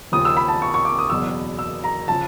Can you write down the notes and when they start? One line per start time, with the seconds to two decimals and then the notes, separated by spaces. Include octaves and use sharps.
0.12 D#2 C#3 F3 D#6
0.25 E6
0.37 B5
0.48 A5
0.62 C#6
0.74 C#6
0.85 D6
0.99 D#6
1.10 F#1 E2 B2 F#3 E6
1.59 E6
1.84 A#5
2.08 C#3 F3 A5